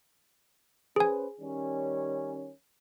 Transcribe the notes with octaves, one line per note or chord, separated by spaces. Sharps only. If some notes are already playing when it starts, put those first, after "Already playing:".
C#4 G#4 B4 C5 G#5
D#3 G3 C#4